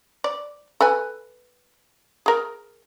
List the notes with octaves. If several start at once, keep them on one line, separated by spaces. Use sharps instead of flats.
D5
A4 B4 G#5
G#4 A#4